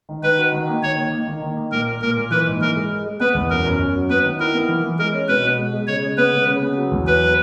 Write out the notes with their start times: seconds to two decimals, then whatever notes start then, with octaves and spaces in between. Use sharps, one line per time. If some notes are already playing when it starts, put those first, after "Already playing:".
0.09 D#3
0.23 D#3 B4
0.38 F#4
0.52 D#3
0.67 A#3
0.82 D#3 C#5
0.97 D#3
1.12 A#3
1.27 D#3
1.42 D#3
1.57 A#3
1.72 A#2 A#4
1.87 A#2
2.01 A#2 A#4
2.16 A#2
2.31 E3 B4
2.46 G#2
2.61 E3 A#4
2.76 G#3
2.90 G#3
3.06 G#3
3.20 B3 B4
3.35 E2
3.50 F#2 A#4
3.64 F#2
3.79 F#2
3.95 F#3
4.10 B3 B4
4.24 D#3
4.39 E4 A#4
4.54 B3
4.68 E3
4.84 E3
4.99 G#3 A#4
5.13 C#4
5.28 B2 B4
5.44 B2
5.58 G#3
5.73 G#3
5.87 C#3 C#5
6.02 G#3
6.17 B3 B4
6.33 C#3
6.47 C#3
6.62 B3
6.77 F#3
6.92 E2
7.07 F#3 B4